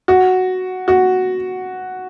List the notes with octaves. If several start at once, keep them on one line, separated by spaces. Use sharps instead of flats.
F#4
F#4